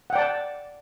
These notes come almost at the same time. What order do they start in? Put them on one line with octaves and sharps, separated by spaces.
F#5 G5 D5 A5